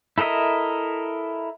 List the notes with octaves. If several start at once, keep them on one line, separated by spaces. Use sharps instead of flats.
E4 A4 A#4 D#5 E5